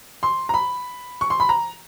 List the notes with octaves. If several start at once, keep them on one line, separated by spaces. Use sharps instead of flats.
C6
A#5
B5
C#6
C6
B5
A#5